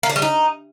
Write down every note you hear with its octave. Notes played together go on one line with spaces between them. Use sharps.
A#3
D4
G3
D#4